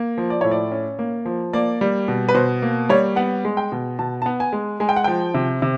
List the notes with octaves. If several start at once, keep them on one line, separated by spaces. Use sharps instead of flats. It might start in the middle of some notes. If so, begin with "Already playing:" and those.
Already playing: A#3
F3
D5
A2 C#5
D5
C#4
A#3
F3
A#3 D5
G3
B2
B4
B2 C5
A#3
G3 C#5
B3 F#5
G#3
G5
B2
B2 A5
A5
B3
G#5
G#3
G#3 G#5
G5
F#5
F3 G5
C3
C3